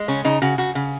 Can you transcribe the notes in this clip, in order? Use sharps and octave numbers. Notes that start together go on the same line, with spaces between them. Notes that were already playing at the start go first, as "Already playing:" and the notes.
Already playing: G#3
C#3 C#4
C#3 D#4
C#3 F#4
C#3 F#4
C#3